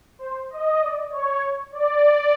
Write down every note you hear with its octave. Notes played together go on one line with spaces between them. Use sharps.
C5
D#5
D5
C#5
D5
D5